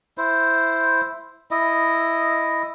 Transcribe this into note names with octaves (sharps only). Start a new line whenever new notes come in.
E4 C5
E4 D#5